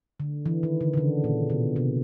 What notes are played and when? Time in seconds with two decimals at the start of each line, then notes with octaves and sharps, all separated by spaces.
0.20 D3
0.46 E3
0.63 D#3
0.81 D3
0.94 D3
0.97 C#3
1.24 A#2
1.50 B2
1.76 C3